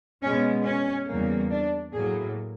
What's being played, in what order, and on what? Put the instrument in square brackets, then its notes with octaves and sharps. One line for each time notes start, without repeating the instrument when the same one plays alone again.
[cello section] B2 G#3 B3 C#4
C#4
E2 C#3 E3 G3 A#3
D4
A2 F#3 A#3 G#4